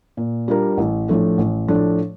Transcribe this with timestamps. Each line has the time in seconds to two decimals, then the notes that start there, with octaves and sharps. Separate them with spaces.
0.17 A#2
0.48 G3 D4 F4 A#4
0.78 A1
1.08 A2 F3 A3 D4
1.38 A1
1.68 A2 F3 A3 D4